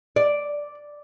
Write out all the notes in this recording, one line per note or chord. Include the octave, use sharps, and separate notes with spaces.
D5